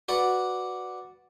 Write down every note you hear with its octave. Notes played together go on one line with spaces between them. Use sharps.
F#4 B4 D5 F#5